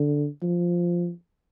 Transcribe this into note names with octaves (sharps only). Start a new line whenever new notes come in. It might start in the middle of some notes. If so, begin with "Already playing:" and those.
Already playing: D3
F3